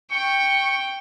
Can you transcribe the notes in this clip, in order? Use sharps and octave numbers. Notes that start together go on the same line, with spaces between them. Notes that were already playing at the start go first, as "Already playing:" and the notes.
G5 C#6